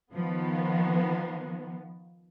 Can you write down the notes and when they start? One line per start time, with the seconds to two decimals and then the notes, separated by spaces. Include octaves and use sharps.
0.12 D#3 F3 B3